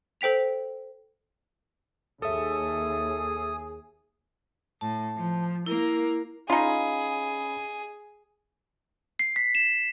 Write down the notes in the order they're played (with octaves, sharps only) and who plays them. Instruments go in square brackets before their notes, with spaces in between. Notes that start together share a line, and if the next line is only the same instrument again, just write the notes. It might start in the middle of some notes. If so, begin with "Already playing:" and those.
[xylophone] A4 C5 G5 B6 F7
[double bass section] D#2 [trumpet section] G#4 [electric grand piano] A4 E5 [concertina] D#6
[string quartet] A2 [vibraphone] A5
[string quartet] F3
[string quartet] A#3 A#4 [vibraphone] E4
[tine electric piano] C#4 B5 [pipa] D#4 F4 [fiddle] G#4
[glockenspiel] C7
B6
E7